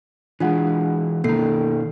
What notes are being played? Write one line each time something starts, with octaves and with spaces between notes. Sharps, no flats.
E3 G#3 D4 F4 F#5
B2 D#3 A#3 A4 C7